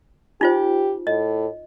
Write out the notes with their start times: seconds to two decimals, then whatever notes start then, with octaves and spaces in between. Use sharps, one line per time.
0.41 D#4 F4 G4 C5
1.07 A2 D#5